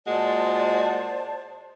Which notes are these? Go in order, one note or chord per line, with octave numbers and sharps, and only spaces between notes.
A#2 G#3 F#4 C5 D5 A5